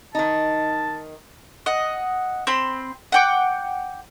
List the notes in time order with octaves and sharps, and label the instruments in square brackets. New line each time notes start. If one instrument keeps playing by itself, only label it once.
[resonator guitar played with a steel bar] D#3 D#4 [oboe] A5
[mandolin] D#5 F#5
C4 B5 C6
F#5 G5 D6